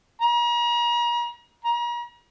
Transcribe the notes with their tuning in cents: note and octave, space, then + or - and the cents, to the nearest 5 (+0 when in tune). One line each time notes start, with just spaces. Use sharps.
A#5 +40
A#5 +40